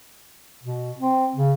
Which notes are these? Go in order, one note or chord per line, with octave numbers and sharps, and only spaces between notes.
B2
C4
C#3